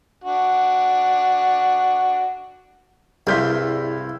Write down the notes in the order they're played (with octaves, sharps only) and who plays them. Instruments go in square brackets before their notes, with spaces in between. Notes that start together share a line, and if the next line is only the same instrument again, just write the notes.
[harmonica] D4 F#4
[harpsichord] C2 G2 [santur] E4 F5 C6 [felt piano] G#4 G6 B6